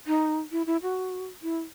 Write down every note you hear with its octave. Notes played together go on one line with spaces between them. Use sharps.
D#4
E4
E4
F#4
E4